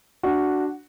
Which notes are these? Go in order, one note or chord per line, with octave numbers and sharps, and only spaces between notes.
D4 F#4